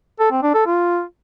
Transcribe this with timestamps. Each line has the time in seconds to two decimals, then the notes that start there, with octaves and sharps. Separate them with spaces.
0.20 A4
0.31 C4
0.43 D4
0.54 A4
0.66 F4